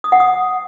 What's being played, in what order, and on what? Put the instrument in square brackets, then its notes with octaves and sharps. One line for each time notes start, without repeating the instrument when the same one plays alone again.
[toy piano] D#6
F#5
D#6